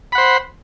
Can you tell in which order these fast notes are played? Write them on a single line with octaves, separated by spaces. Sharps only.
B5 F#5 C5